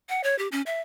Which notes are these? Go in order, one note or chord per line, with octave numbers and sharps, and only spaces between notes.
F#5
C#5
G4
C#4
E5